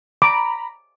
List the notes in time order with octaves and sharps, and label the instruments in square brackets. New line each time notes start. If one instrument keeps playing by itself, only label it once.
[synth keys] A#5 B5 [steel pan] D6